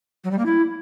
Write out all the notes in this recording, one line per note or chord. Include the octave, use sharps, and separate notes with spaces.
F#3
G3
A#3
E4